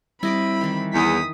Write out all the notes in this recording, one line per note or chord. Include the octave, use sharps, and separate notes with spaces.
G3 C4 E4 D#5 B5 D6
D#3 E3
E2 D#6 B6